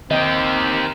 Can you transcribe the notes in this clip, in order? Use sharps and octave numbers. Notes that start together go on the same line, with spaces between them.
D#3 C4 G4 D#5